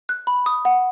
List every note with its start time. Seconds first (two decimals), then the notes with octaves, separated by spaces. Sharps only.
0.09 F#6
0.27 B5
0.46 D#6
0.65 F#5